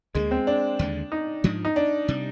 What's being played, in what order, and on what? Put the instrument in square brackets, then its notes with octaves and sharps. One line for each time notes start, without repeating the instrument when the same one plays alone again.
[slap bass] D2 D3 G3 A#3 [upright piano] G#3
[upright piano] C4
D4
[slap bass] D#2 D3 G#3
[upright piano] D#4
[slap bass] G#2 F3 G#3 D4
[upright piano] D#4
D4
[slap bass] C3 G3